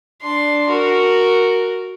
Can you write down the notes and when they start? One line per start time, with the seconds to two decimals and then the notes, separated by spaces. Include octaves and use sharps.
0.22 D4 C6
0.70 F#4 A#4